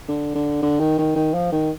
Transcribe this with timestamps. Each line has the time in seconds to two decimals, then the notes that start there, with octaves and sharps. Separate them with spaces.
0.09 D3
0.35 D3
0.62 D3
0.80 D#3
0.98 D#3
1.16 D#3
1.34 F3
1.52 D#3